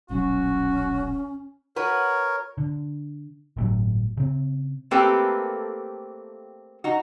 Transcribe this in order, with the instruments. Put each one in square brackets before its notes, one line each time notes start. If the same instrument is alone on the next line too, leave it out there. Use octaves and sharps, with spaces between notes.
[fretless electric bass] D#1 B1 F#3 [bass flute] C#4 [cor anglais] F#4
[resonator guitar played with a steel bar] F#4 B4 [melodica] A#4 C#5
[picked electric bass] D3
G1 A2 F#3
C#3 C4
[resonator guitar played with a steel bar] A3 A#3 C4 G4 A4 B4
D#4 F#4